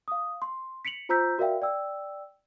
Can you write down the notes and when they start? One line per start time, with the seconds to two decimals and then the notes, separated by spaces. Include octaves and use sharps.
0.08 F5 D#6
0.42 C6
0.85 B6 C#7 D7 F7 F#7
1.09 F4 C5 A#5 E6 G6 B6
1.38 F#4 A#4 D5 E5 F5 G5
1.62 D5 G5 E6